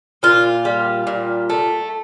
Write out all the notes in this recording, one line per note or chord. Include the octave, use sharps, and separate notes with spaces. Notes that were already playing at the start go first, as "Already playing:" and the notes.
A#2 F4
G3
A#2
A3